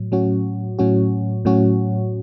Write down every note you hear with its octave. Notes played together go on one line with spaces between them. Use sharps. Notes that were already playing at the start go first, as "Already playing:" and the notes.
Already playing: A2 F#3
A2 F#3 C#4 F#4
A2 F#3 C#4 F#4
A2 F#3 C#4 F#4